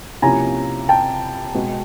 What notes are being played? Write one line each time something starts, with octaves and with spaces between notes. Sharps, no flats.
C3 F3 A#3 C#4 E4 G#5 A#5
G5 A5
B2 G#3 B3